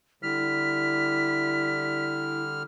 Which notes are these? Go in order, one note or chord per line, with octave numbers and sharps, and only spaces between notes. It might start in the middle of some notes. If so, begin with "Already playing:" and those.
D3 G3 E4 F6 B6